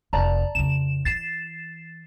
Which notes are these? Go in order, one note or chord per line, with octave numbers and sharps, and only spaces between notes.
F1 D5 A5 A#5
F2 C#3 E7
E3 A6 C7 E7